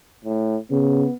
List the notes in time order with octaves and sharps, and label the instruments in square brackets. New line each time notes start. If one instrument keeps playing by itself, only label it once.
[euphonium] A2
[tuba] C#3 [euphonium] B3